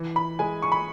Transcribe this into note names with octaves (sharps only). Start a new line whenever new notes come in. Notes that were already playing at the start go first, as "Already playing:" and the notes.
Already playing: E3
B5
G#3 G#5
C#6
B5